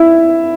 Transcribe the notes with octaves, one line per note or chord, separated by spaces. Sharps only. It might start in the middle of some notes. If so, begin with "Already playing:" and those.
Already playing: E4 E5